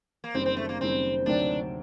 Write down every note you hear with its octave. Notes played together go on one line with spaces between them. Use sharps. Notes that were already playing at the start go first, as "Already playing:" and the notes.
A#3
F#1 F#2 D#3 G3 C4
C4
A3
A#3
F#1 F#2 D#3 G3 C4
D2 C3 D#3 F#3 C4 D4